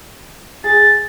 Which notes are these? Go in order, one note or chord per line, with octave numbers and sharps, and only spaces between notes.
G#4 A6